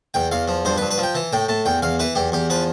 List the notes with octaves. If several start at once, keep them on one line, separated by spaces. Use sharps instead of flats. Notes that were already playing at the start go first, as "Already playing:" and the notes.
E2 G5
E2 F5
F3
G2 C5
B4
G2
B4
F3
G5
E3 A5
A2 G5
A2 A5
E2 G5
E2 F5
E3 B4
E2 G4
E2 G4
F3 B4